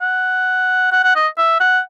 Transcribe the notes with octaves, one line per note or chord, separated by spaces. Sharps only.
F#5
F#5
F#5
D#5
E5
F#5